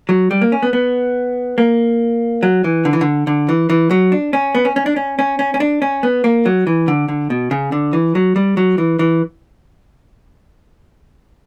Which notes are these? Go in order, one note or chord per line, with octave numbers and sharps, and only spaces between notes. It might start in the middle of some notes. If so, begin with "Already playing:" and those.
F#3
G3
A#3
C#4
B3
B3
A#3
F#3
E3
D3
E3
D3
D3
E3
E3
F#3
D4
C#4
B3
C#4
C#4
D4
C#4
C#4
C#4
C#4
D4
C#4
B3
A#3
F#3
E3
D3
D3
B2
C#3
D3
E3
F#3
G3
F#3
E3
E3